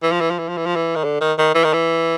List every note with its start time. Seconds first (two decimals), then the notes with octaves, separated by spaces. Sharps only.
0.03 E3
0.12 F3
0.21 E3
0.30 F3
0.39 E3
0.48 F3
0.57 E3
0.66 F3
0.76 E3
0.96 D#3
1.04 D3
1.21 D#3
1.38 D#3
1.55 E3
1.64 D#3
1.73 E3